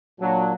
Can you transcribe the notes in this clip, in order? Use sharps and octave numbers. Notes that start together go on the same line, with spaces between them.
A#2 F#3 A#3 D4